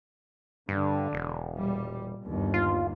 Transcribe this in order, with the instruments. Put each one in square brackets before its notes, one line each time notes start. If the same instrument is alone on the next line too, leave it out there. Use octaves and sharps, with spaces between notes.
[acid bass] G2 [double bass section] D3
[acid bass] E1
[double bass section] A#2 G3
G1 D#2
[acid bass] F4